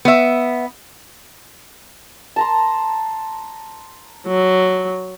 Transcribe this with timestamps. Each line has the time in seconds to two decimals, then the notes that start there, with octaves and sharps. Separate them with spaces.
0.05 B3 E5
2.36 A5 A#5 C6
4.27 F#3